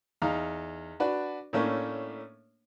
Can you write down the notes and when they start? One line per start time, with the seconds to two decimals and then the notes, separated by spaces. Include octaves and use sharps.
0.22 E2 D#4 F5 A#5
1.00 D4 F#4 B4 D5
1.53 A2 A3 A#3 C#4 D4